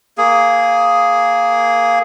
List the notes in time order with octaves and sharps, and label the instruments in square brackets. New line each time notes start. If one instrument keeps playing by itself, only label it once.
[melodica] A#3 G#4